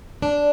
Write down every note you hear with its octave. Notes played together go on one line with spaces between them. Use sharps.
D4